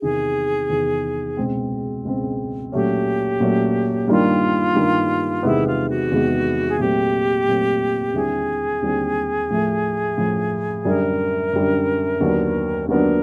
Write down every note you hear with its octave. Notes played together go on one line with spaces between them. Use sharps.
E2 C3 D#3 G#4
E2 C3 D#3
C#2 B2 G#3 C4
C#2 B2 G#3 C4
A#2 F#3 A3 C#4 G4
A#2 F#3 A3 C#4
G2 D#3 G3 A#3 F4
G2 D#3 G3 A#3
E2 C3 D#3 G#3 B3 E4
F4
F#4
E2 C3 D#3 G#3 B3
G#4
A#2 F#3 A3 C4 G4
A#2 F#3 A3 C4
D#2 D3 G3 C4 E4 G#4
D#2 D3 G3 C4 E4
A2 F3 A3
A2 F3 A3
F#2 D3 G3 A#4
F#2 D3 G3
D#2 D3 F#3 B3 D4
D#2 D3 F#3 B3 D4 A#4